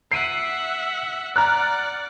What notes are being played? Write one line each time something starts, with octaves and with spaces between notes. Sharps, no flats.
E5 F#5 C7 D7 D#7
D5 F#5 A#5 F6 F#6